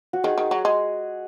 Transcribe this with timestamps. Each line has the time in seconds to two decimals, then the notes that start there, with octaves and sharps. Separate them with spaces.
0.13 F#4
0.24 D#3 G#4
0.38 D#3
0.51 F#3
0.65 G#3